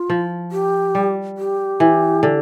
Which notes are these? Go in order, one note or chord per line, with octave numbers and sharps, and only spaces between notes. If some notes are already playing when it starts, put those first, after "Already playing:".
Already playing: F4
F3
G4
G3
G4
E3
D3